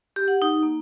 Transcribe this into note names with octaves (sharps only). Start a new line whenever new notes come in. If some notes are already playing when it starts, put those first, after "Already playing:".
G4
F#5
D#4
A#3